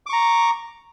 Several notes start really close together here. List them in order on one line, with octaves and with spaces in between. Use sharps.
D6 C#6 A#5